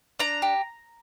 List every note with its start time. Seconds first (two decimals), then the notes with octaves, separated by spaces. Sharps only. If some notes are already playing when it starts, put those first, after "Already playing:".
0.19 D4 A#5
0.42 G4